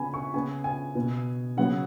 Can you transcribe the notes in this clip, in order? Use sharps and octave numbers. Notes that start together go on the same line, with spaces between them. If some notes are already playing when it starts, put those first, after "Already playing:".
Already playing: C#3 B3 G#5 B5
C#6
C#3 B3 G#5
G#5
B2 B3
C#3 F#3 B3 F#5